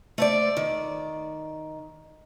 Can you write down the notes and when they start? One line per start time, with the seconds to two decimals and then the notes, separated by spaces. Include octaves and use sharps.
0.18 A3 C5 D5
0.57 D#3